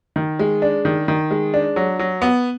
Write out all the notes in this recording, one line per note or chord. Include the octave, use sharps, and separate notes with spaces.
D#3
G#3
D4
D#3
D#3
G#3
D4
F#3
F#3
B3